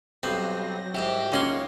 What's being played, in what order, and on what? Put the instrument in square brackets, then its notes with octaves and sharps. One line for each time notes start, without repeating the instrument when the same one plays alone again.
[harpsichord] B1 G2 B3 [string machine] F#3 A#6 [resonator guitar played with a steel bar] C4
[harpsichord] C2 G#2 C3 [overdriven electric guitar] G4
[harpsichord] C#2 F#4 C6 [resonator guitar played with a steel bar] G#3 A#3 C#4 [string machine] D#4 C#5